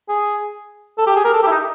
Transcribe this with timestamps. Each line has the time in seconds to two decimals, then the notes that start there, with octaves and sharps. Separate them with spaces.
0.09 G#4
0.98 A4
1.07 G4
1.16 G#4
1.25 A#4
1.34 A4
1.43 G4
1.47 E4
1.51 D#4